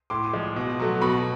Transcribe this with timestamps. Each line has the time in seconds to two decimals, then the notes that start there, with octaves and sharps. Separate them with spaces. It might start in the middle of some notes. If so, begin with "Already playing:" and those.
0.10 A2 C6 D6
0.33 F3 G#3
0.56 B2
0.80 F#3 A3
1.01 B2 B5 C#6